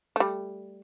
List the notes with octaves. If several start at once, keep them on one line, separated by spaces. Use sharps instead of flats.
G3 A3